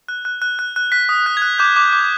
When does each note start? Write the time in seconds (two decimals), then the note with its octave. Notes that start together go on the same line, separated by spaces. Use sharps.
0.08 F#6
0.25 F#6
0.42 F#6
0.59 F#6
0.76 F#6
0.92 F#6 B6
1.09 D#6
1.26 F#6
1.37 G#6
1.42 F#6
1.59 D6 G6
1.76 D6
1.93 D6